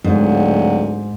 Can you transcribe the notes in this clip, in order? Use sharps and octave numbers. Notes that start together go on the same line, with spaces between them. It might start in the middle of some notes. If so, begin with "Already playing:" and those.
D1 G#2